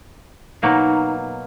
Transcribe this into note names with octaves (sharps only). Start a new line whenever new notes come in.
B2 F#3 A#3 D#4